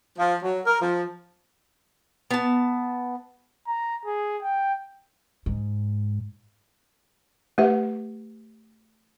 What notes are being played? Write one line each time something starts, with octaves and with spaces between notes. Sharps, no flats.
F3
F#3
A#4
F3
B3 A5
A#5
G#4
G5
G#2
A3 G4 B4 E5 F#5